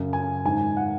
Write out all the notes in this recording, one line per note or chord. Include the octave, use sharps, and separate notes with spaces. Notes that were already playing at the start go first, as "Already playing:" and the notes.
Already playing: F#2 C#3
G#5
G#2 D#3 G#5
F#5